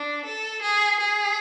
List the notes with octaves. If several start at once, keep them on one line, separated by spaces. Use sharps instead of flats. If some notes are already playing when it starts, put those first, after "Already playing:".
Already playing: D4
A4
G#4
G#4